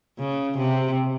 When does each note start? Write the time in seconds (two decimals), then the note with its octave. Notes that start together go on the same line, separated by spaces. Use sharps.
0.19 C#3
0.58 C3